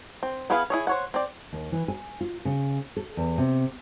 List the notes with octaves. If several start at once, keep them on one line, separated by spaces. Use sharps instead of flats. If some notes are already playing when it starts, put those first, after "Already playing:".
C4
B3 E4 G#4 B4 F5
E4 G#4 C#5
C5 C#5 F#5
C4 D5
D#2
E3
G#5
F4
C#3
A4
E2
C3